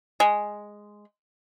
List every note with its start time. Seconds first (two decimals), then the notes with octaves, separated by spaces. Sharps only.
0.20 G#3